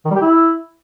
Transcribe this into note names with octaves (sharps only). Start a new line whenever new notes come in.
D#3
G3
G4
E4